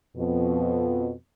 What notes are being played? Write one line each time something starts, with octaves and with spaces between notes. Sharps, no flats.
F2 B2